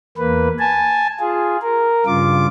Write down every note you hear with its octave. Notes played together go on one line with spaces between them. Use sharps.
E2 A#3 B4
G#5 A5
F4 G#4
A#4
G2 C#3 F4 D6